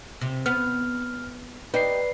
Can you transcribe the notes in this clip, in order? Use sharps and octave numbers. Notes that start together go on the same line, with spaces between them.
C3
B3 F6
D#4 G4 B4 D5 C7